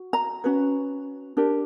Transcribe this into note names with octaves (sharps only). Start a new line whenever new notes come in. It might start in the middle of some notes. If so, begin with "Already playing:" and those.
Already playing: F#4
A#5
C#4 F#4 B4
D4 G4 A#4